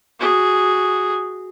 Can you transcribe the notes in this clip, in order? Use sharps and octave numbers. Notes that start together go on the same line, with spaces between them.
F#4 G#4